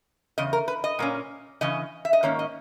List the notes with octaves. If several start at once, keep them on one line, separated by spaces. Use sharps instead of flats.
E2 C#3 D#5
A#4
B4
D#5
A#2 A#3 C#4
C#3 E3 C#4 D#5
E5
D#5
G#2 D#3 A#3 C#4 C#5
D#5